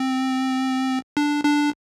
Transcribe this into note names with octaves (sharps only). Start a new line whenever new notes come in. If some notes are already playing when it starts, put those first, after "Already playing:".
Already playing: C4
D4
D4